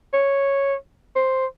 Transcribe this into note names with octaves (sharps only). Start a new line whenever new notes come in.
C#5
C5